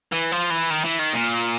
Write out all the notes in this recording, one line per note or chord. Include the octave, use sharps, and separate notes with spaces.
E3
F3
E3
D#3
E3
D#3
A#2